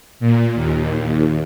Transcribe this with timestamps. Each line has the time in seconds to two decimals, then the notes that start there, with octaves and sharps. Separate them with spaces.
0.20 A#2
0.55 D#2